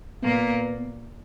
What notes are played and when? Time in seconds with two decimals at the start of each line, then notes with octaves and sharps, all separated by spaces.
0.22 A#2 A#3 B3